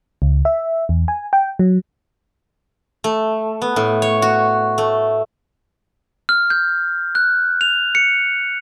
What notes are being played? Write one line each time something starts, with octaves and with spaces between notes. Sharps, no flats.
C#2
E5
E2
G#5
G5
F#3
A3
B3
A2
C#5
F#4
A3
F6
G6
F#6
F7
C#7